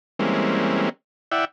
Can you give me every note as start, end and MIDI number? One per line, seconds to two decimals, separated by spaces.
0.19 0.89 52
0.19 0.89 55
0.19 0.89 56
0.19 0.89 58
0.19 0.89 60
0.19 0.89 61
1.32 1.45 64
1.32 1.45 74
1.32 1.45 76
1.32 1.45 78
1.32 1.45 79